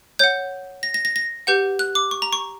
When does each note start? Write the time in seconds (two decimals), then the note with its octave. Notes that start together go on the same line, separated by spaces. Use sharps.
0.19 C#5 F#5 G6
0.83 A#6
0.94 A#6
1.05 A#6
1.16 A#6
1.47 G4 B4 F#5 G6
1.79 F#6
1.95 D6
2.11 C#6
2.22 A#5
2.33 C#6